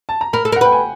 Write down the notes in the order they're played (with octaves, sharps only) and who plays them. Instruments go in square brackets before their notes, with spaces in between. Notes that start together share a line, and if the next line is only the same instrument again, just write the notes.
[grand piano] A5
A#5
[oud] A#4 [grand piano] B5
[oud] A4
A#4
[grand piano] F#5
[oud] B4 [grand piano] G5
[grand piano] G#5